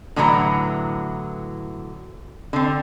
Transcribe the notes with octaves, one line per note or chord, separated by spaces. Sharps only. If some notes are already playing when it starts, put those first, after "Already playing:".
A2 D3 E3 F#3 E4 A#5
D3 C4